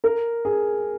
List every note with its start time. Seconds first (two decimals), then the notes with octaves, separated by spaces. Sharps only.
0.04 A#4
0.45 G#4